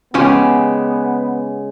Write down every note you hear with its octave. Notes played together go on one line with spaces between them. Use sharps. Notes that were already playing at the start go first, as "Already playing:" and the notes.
C#3 F3 G#3 B3 C#4 G4